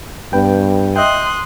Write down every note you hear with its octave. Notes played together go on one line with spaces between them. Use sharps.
G2 B3 B4 G5
D#5 E5 G5 C6 D#6 F#6